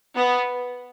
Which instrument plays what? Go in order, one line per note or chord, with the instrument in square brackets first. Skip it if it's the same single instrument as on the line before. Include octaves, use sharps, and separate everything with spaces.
[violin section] B3